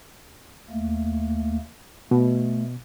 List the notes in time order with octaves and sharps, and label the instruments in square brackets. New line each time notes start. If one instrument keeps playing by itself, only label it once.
[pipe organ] D#2 A3 A#3
[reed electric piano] B2 [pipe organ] A3